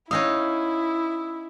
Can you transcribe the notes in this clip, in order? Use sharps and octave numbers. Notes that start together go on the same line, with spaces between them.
C#4 D#4 E4 F5 D#6 E6